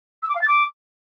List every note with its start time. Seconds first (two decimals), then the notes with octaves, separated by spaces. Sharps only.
0.22 E6
0.29 D6
0.35 F5
0.41 A6
0.47 D6